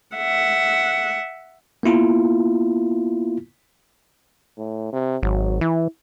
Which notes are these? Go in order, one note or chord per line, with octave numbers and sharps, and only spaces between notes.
E5 F#5
A#3 B3 E4 F4
A2
C3
G#1 F#3
E3 E4